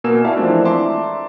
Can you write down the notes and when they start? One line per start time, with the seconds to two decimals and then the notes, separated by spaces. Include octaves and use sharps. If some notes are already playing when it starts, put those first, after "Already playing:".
0.04 B2 A#3 A#4 G#5 E6 E7
0.24 E4 F#4 D5 E5 F5 A5
0.36 E3 F3 G#3 A3 C4 D4
0.65 D5 E5 A5 A#5 C6 D6